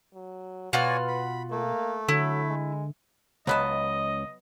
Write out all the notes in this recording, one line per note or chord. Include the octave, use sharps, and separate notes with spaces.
F#3
B2 F4 F#4 B4 C#5 D5 G#5 F6
B5
A3 A#3
D3 F#3 E4
G#3
C#2 F#3 B3 D#5 A5